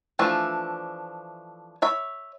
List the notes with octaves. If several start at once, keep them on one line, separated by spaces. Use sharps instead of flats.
E3 F3 A3 D4
C#5 E5 B5